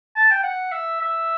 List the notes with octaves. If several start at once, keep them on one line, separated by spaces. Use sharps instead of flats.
A5
G5
F#5
E5
E5